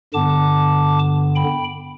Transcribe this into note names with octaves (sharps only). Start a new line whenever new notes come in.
G2 D3 B3 A5 D6
G5 B5